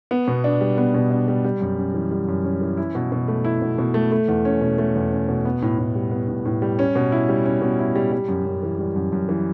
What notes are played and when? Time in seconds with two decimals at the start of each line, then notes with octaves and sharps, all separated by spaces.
0.11 B3
0.28 B2
0.44 D4
0.61 G3
0.78 B3
0.94 B2
1.11 D4
1.28 G3
1.44 G3
1.61 F#2
1.78 C#4
1.94 E3
2.11 G3
2.28 F#2
2.44 C#4
2.61 E3
2.77 E4
2.95 B2
3.12 B2
3.28 A3
3.45 E4
3.62 B2
3.78 B2
3.94 A3
4.12 A3
4.28 E2
4.45 C#4
4.61 B2
4.78 A3
4.95 E2
5.12 C#4
5.29 B2
5.45 B3
5.62 A2
5.78 A2
5.95 G3
6.11 B3
6.28 A2
6.45 A2
6.62 G3
6.79 C#4
6.95 B2
7.12 E4
7.29 G3
7.46 C#4
7.62 B2
7.79 E4
7.96 G3
8.12 G3
8.29 F#2
8.46 F#2
8.63 E3
8.79 G3
8.96 F#2
9.12 F#2
9.29 E3